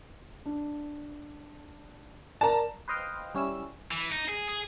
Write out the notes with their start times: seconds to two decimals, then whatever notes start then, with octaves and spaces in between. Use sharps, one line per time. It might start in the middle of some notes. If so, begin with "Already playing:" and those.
0.46 D4
2.41 A#4 D5 A5 A#5
2.88 B4 C5 D#5 F5 G5
3.35 G3 C#4 E4 E6
3.91 E3
4.12 D#4
4.29 G#4
4.49 G#4